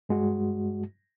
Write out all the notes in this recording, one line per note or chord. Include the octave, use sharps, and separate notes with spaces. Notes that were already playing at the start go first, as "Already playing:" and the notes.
G2 G#3 F#4